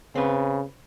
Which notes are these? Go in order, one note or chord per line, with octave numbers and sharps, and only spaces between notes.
C#3 C4 B4